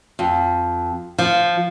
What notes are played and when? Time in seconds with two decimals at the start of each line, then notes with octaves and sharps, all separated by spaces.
0.19 F2
1.18 F3